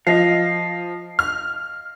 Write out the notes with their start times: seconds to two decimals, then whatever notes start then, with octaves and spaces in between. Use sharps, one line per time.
0.07 F3 D#5 F5
1.19 F6